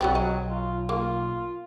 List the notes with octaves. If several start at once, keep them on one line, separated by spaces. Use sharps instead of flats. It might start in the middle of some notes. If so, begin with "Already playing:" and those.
B1 F#3 G3 C4
F#3 D#5
F4
A#3 F4